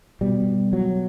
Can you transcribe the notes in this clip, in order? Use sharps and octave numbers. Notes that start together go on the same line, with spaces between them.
B2 G3
F#3